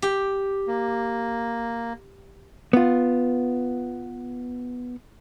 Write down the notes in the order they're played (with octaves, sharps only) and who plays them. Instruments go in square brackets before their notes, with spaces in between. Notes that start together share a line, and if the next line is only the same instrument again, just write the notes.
[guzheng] G4
[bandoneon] A#3
[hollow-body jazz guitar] B3 F4